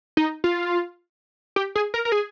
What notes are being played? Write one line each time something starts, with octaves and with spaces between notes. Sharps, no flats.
D#4
F4
G4
G#4
A#4
A#4
G#4